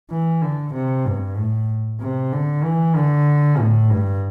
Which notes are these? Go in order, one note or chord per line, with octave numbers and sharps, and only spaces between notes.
E3
D3
C3
G2
A2
C3
D3
E3
D3
A2
G2